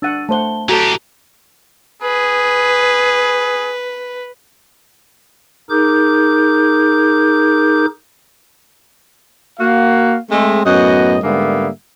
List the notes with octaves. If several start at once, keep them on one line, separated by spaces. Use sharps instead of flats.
D4 F#5 E6 A6 D#7
A3 C5 F#5 A5 G7
E3 F#4 G4 A4 A5 A#5
G#4 B4
D#4 G#4 A#4 D6 G6
A#3 F#4 F5
G#3 A3 C4
F#2 A2 B3 F#4 D#5
G#2 D3 G3 A#3 B3 E5